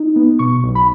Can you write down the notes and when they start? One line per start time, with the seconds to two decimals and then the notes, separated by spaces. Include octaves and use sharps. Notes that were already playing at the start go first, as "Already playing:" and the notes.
Already playing: D#4
0.16 B3
0.39 B2 C#6
0.63 B1
0.75 B5